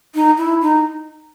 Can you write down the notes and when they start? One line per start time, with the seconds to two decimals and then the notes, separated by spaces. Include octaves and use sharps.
0.15 D#4
0.38 E4
0.62 D#4